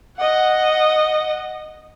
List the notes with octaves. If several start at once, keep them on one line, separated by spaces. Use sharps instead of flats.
D#5 F#5